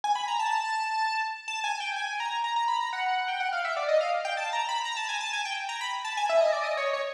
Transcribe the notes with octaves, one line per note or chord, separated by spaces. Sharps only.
G#5
B5
A#5
A5
A5
G#5
G5
G#5
A#5
A#5
A#5
B5
A#5
F#5
G5
F#5
F5
E5
D5
D#5
F5
G5
A5
A#5
B5
A#5
A5
G#5
A5
G#5
G5
A#5
B5
A5
G#5
E5
D#5
D5
D#5
C#5
C#5